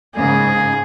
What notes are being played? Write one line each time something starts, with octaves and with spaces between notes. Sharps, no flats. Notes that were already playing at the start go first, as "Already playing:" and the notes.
G#2 C#3 A#3 G#4